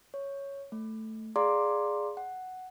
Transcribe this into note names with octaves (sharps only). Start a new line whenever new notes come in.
C#5
A3
G#4 D5 F5 A#5 C6 D6
F#5